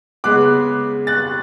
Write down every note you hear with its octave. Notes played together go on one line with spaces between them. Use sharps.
C#3 G#3 B3 D6 F#6
F#6 A6